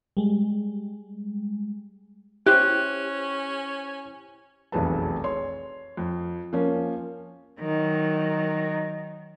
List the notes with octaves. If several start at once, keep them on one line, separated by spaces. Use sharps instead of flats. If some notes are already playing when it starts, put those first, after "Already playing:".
G3 G#3
C#4 E4 G4 C5 F#6
F1 B1 E2 G#4 B4 A5
C#5 C6
F2
F3 A#3 C#4
D#3 F#3